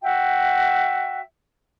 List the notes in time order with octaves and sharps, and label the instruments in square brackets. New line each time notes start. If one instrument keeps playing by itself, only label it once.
[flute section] F#4 E5 G5